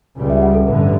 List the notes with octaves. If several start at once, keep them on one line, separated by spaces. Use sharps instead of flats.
C#2 C#3 G3
E5
F#5
A4
A1 G2 D3 B4